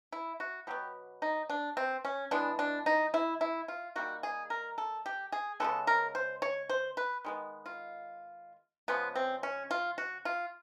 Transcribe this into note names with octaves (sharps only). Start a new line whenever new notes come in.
E4
F#4
B2 F#3 B3 G4
D#4
D4
C4
C#4
E3 G#3 B3 D4
D4
D#4
E4
E4
F4
D#3 G3 A#3 F#4
G#4
A#4
A4
G4
G#4
C#3 F3 G#3 B3 A4
A#4
C5
C#5
C5
B4
D#3 G#3 B3
F4
C#3 F3 G#3 B3
C4
C#4
F4
F#4
F4